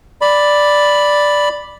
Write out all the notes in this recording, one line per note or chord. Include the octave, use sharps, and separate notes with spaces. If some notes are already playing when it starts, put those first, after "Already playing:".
D5 B5